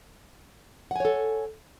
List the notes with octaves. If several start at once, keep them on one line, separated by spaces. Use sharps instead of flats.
A4 C#5 F#5 G#5